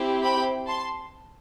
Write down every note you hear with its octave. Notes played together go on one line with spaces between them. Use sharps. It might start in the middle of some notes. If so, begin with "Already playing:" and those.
Already playing: C4 E4 G4
G5 B5
A5 C6